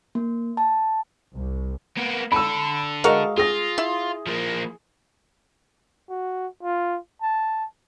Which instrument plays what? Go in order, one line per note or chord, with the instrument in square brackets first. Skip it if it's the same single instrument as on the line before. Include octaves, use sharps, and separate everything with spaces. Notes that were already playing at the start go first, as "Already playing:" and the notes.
[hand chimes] A#3
A5
[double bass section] C2
[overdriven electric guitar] A#3 B3
[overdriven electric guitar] D4 A4 [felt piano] B5 E6
[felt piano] G#3 D#5 [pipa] F#4 A#4 F5
[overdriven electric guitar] F4 [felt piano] G#4 A#6
[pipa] E4
[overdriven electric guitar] F3 A#3
[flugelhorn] F#4
F4
A5